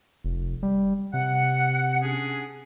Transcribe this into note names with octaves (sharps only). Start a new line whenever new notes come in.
F1
G3
C3 F#5
C#4 D4 G#4